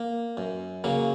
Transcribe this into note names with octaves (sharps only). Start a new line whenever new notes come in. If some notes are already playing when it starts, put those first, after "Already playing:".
Already playing: A#3
F#2
C#3 F#3 A#3